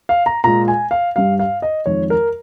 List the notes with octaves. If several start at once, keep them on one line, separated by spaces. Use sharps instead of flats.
F5
A#5
A#2 G#3 A#5
G#5
F5
G2 G3 F5
F5
D#5
F2 D#3 G#3 C#5
A#4